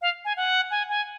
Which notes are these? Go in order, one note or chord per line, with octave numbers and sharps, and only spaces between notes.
F5
G#5
F#5
G#5
G#5